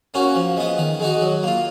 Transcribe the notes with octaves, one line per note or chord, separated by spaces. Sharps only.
A#3 C#4 F#4
F3
G#3 B3
D#3
G#3 D#4 F#4
F#3
A#3 F4